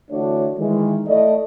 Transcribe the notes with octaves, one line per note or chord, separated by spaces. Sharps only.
D3 E3 A3 D4 F#4 C#5
D#3 E3 G#3
A3 E4 D5 D#5